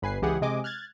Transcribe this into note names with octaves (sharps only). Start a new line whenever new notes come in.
G1 B4 G#5 C7
C#2 E3 G4 G#4 F#5
C3 G#3 D#5 G#5 D6
F6 F#6 G#6 A6